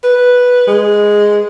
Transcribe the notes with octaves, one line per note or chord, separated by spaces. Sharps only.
B4
G#3